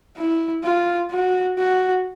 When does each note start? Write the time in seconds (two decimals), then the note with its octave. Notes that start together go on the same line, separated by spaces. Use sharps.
0.17 E4
0.64 F4
1.10 F#4
1.58 F#4